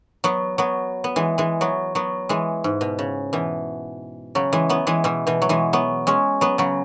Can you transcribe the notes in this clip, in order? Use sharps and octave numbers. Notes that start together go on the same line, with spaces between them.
F#3 B3
F#3 B3
B3
E3 G#3
E3 G#3
F#3 B3
F#3 B3
E3 G#3
G#2
B2
C#3
B2 E3
C#3 F#3
E3 G#3
F#3 B3
E3 G#3
B2 E3
B2 E3
F#3
E3 G#3
F#3 B3
G#3 C#4
F#3 B3
C#3 F#3